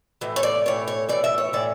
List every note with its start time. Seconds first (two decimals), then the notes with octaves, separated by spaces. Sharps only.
0.21 A2 E3
0.36 C#5
0.43 D5
0.66 A2 E3 C#5
0.88 C#5
1.09 A2 E3 D5
1.24 E5
1.38 C#5
1.53 A2 E3 D5